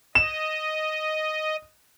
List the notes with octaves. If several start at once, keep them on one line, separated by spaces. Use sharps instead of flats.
D#5 E7